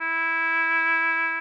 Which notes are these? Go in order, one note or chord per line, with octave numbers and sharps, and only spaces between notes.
E4